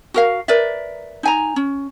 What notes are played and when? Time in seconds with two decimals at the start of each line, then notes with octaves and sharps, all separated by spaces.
0.14 F#4 A#4 F5
0.48 A#4 B4 D5 E5
1.23 D#4 G#5 A#5
1.56 C#4